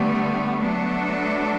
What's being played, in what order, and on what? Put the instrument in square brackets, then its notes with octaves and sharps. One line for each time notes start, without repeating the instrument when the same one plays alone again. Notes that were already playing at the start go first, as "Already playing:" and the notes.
Already playing: [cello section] D3 G3 B3 [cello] A3
[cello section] F#3 A3 D4 F#4 A4 [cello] B3